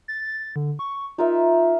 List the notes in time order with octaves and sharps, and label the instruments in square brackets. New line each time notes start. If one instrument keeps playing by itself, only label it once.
[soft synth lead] A6
D3
C#6
[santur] D#4 A#4 E5 [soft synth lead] F4